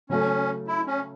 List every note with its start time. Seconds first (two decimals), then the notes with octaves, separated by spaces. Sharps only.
0.10 C#3 F#3 A3 C#4
0.67 E4
0.87 C#4